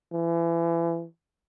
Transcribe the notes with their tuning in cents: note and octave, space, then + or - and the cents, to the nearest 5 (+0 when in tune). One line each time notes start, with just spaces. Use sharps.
E3 +30